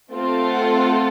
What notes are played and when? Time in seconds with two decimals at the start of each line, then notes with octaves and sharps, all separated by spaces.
0.11 A3 C4 F4 A4
0.49 F#5